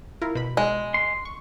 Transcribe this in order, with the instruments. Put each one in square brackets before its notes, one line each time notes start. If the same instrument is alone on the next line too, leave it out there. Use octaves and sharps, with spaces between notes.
[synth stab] E4 F4 A#4
B2 B5
[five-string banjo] G#3
[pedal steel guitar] C6
[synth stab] C#6